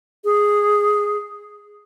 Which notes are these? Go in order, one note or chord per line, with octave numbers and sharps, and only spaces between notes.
G#4